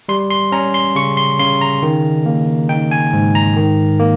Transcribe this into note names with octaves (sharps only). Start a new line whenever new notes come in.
G3 C6
C6
C#4 A#5
C6
C#3 C#6
C6
C#3 C6
A#5
D#3
A#3
D#4 G5
G#5
G#2
A#5
D#3
A#3